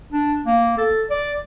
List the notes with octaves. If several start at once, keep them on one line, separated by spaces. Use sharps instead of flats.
D4
A#3
A4
D5